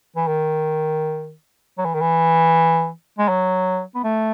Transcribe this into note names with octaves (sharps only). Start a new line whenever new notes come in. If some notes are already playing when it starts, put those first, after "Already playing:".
E3
D#3
F#3
E3
D#3
E3
G#3
F#3
B3
A3